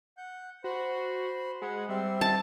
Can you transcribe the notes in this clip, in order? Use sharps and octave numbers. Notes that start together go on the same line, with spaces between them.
F#5 G6
F#4 C5 B5 C6
G#3 F#5 B5
G3 C4 E5 C6
A5